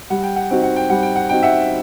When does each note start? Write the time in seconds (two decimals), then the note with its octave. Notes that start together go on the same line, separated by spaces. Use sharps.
0.10 G3 F#5
0.23 G5
0.36 F#5
0.50 C4 D#4 F#4 G5
0.63 F#5
0.76 G5
0.90 G3 F#5
1.03 G5
1.16 F#5
1.29 C4 D#4 F#4 G5
1.43 E5 F#5